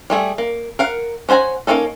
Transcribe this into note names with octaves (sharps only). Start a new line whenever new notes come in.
G3 A3 G#4
A#3
A#4 F5 F#5
C#4 C5 F#5 G#5 A#5
A#3 C4 C#4 D#4 A4